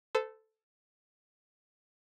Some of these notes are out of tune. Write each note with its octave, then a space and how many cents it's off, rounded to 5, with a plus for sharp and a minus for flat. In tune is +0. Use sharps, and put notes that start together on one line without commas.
A4 +0 C5 -35